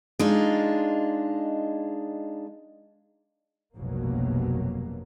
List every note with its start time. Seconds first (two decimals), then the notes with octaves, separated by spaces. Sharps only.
0.19 G#3 D4 D#4 F4
3.75 F1 A#1 G2 B2 F#3 A#3